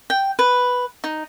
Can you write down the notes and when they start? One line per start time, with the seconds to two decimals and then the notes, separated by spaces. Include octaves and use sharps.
0.10 G5
0.39 B4
1.04 D#4